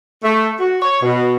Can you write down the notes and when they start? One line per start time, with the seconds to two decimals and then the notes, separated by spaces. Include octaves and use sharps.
0.24 A3
0.59 F#4
0.82 C#5
1.02 B2